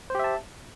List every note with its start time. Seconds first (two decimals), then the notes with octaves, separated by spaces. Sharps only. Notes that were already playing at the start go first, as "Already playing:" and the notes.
0.10 C5
0.15 G4
0.19 E5
0.24 A5